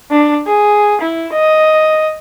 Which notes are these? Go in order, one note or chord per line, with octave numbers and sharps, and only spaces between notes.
D4
G#4
E4
D#5